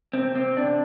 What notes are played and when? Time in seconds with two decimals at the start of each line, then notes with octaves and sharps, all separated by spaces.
0.13 C3 C4
0.35 C3 C4
0.57 C3 D4